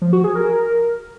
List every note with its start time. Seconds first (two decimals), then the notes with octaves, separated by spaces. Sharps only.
0.01 F3
0.13 F#4
0.24 G#4
0.35 A#4